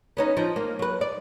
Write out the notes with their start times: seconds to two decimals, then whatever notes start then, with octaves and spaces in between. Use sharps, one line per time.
0.17 B3 C#4 D#4
0.37 F3 D#4
0.56 A#3
0.79 F#3 B4
1.01 D5